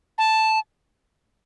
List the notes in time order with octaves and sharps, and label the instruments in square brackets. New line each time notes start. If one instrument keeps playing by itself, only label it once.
[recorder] A5